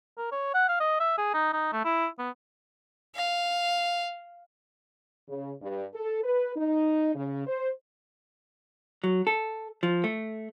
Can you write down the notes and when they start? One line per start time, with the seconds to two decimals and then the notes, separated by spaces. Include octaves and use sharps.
0.17 A#4
0.32 C#5
0.54 F#5
0.68 F5
0.80 D#5
1.00 E5
1.18 G#4
1.34 D#4
1.53 D#4
1.73 A3
1.85 E4
2.19 B3
3.15 F5
5.27 C#3
5.61 G2
5.94 A4
6.23 B4
6.55 D#4
7.15 C#3
7.47 C5
9.04 F#3
9.27 A4
9.83 F3
10.04 A3